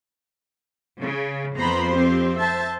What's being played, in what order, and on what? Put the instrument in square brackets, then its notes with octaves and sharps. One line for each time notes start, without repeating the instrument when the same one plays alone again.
[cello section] C#3
[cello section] F2 C5 [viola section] B3 A#5 B5
[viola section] C4 G4
C5 E5 A5